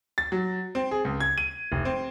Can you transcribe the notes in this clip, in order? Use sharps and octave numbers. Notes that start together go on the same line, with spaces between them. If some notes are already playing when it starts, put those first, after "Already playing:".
A6
F#3
C4
G#4
C#2
G#6
D#7
F1
C4